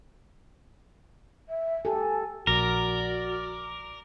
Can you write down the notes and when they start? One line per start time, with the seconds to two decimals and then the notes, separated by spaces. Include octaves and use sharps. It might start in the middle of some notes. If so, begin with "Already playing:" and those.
1.49 E5
1.85 G4 A4 G#5
2.47 A#1 F#4 A#4 D5